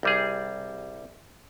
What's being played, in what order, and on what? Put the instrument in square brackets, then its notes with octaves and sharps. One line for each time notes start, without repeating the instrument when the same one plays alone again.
[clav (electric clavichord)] C2 G3 G#4